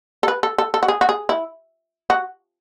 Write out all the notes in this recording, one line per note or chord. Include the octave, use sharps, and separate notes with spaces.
A4
B4
A4
A4
A4
F#4
G#4
F#4
G#4
E4
F#4